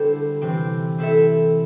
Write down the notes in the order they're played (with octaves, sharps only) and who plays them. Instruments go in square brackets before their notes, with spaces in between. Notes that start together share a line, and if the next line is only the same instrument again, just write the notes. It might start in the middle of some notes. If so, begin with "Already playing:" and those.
Already playing: [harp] D3 G3 E4 A4 C5
C3 E3 C4 G4
C4 E4 A4 E5